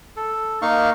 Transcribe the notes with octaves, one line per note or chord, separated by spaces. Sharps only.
A4
A#3 D#4 F5 C#6